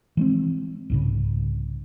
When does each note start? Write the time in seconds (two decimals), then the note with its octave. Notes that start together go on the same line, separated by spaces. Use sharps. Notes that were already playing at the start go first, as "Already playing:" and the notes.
0.17 E3 G#3 C4
0.90 C2 G#2 C#3